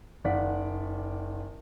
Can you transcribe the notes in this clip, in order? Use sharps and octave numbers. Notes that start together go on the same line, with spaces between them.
F#1 D#3 D5 F5 F#5 B6